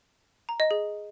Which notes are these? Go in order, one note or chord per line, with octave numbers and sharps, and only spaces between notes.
A#5
D#5
G#4